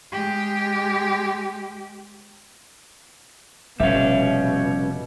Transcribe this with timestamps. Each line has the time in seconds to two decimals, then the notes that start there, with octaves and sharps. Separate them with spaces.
0.12 G#3 G4
3.80 F1 B2 G3 C#4 E5 F5